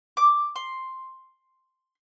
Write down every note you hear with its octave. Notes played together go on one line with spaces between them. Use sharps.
D6
C6